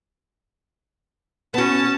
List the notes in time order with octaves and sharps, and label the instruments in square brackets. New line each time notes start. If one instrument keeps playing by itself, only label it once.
[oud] B3 F#4 [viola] C#4 A5